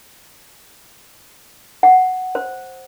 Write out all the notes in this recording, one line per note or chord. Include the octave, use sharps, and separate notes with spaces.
F#5
C5